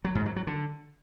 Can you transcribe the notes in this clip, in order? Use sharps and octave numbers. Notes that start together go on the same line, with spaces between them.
F#3
G#2
F#3
F#3
D3